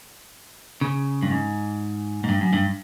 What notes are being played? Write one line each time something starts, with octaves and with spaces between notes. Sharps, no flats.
C#3
G2
G#2
G#2
G2
F#2
G2